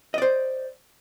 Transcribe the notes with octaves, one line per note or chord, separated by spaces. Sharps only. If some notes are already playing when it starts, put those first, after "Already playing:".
C5 D5 D#5